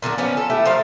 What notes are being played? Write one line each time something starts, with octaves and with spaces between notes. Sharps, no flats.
A#2 D3 D#3 F#3
F3 B3 C#4
A4
A3 E4 G4
D#3 F3 C5 F5